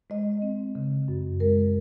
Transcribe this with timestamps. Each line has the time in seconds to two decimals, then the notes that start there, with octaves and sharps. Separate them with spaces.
0.10 G#3 D#5
0.42 C4
0.75 C#3
1.08 F#2
1.40 G#3 A#4